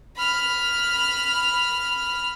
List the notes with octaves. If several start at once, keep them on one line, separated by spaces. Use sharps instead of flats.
B5 F6